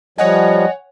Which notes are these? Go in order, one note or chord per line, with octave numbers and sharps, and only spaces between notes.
F3 G3 C#5 D#5 F#5 G#5